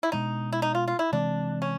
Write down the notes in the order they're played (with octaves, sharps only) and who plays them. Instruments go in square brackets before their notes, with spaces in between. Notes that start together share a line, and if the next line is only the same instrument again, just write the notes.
[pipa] E4
[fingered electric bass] B2 G#3 B3 D4 [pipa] D#4
[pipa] E4
D#4
F4
F4
E4
[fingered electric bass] C3 E3 G#3 C4 [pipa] D4
[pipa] C#4